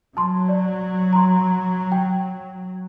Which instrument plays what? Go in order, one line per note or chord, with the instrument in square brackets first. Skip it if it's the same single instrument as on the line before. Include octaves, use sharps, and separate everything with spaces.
[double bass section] F#3 [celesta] A5 C6
[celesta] D5
A#5 C6
G5